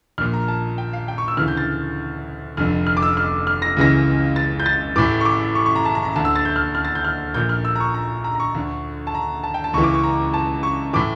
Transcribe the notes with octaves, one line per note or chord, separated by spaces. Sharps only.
A#1 A#2 F6
A#5
A5
G5
F5
G5
C#6
E6
D2 C#3 E3 F6
G6
A6
F1 F2 D3 F6
F6
D6
E6
F6
F6
A#6
C#2 C#3 E3 A#6
A6
G6
A6
A1 A2 E3 D6
C#6
D6
C#6
C#6
A#5
A5
A#5
A#5
D2 D3 A5
E6
A6
G6
F6
F6
A6
G6
F6
A#1 A#2 G6
F6
E6
A#5
C#6
A#5
A#5
A#5
C#6
D2 D3
A5
A#5
A5
G5
A5
C#2 C#3 E3 C#6
D6
C#6
A#5
A5
C#6
A2 E3 D6